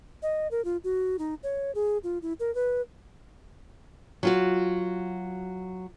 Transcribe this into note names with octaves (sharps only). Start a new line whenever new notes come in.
D#5
A#4
F4
F#4
D#4
C#5
G#4
F4
E4
A#4
B4
F#3 F4 F#4